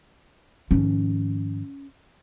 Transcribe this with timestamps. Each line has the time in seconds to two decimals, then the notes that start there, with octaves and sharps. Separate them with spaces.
0.71 G#2 D#3 F3 C#4